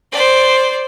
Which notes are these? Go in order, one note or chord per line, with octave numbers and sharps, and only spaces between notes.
C5 D5